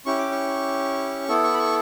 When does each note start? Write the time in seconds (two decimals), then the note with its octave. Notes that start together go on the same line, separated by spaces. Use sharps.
0.06 C#4 E4 G4 C#6
0.18 D6
0.31 C#6
1.28 B3 E4 A4
1.44 C#6
1.54 B5
1.59 C#6